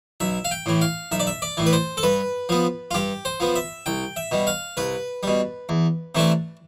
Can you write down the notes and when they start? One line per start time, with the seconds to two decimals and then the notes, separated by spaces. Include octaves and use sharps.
0.20 B1 E5
0.45 F5
0.51 G5
0.66 A2 E3
0.81 F5
1.12 B1 E5
1.20 D5
1.27 E5
1.42 D5
1.57 A2 E3
1.66 B4
1.73 C5
1.97 A4
2.03 G2 B4
2.49 F3 B3
2.91 F4
2.94 G2 G4
3.25 C5
3.40 F3 B3
3.55 E5
3.86 C2 G5
4.16 E5
4.31 B2 G3
4.47 F5
4.77 C2 B4
5.23 B2 G3
5.69 E2
6.15 C3 E3 A3 D4